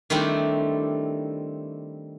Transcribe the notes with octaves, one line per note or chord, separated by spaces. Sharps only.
D#3 G3 A3 C4 D4 E4